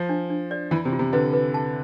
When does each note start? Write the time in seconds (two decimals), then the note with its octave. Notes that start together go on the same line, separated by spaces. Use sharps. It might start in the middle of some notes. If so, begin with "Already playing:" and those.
Already playing: F3
0.09 D4
0.30 D4
0.51 D5
0.71 E3 F4
0.85 C3
0.92 F4
0.99 C3
1.13 D3 B4
1.33 B4
1.54 A5